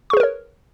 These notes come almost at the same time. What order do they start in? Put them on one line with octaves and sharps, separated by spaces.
C#6 G#4 B4 A#4 C#5